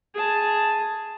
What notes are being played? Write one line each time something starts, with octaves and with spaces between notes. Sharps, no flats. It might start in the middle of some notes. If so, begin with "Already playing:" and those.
G#4 A5